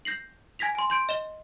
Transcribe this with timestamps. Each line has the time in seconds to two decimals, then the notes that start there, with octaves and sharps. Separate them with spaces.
0.05 G6 A#6 C7 F#7
0.59 G#5 G#6 A#6 B6 F7
0.75 G#5 C6
0.90 C6 G6 D7
1.09 D#5 E7 G7